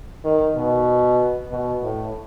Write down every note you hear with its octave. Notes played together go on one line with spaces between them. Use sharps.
D#3
B2
B2
A2